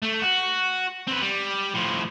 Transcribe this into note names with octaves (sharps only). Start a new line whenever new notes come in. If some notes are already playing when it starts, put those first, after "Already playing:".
A3
F#4
C4 B4
G3
A2 F3